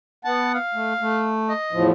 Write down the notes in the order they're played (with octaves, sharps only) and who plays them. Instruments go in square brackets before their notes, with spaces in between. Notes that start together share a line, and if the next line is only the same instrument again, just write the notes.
[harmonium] B3 F#5 [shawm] A5
[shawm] F5
[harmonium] A3
A3
[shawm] D#5
[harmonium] E2 A2 F3